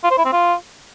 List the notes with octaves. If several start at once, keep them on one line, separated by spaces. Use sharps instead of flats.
F4
C5
E4
C4
F4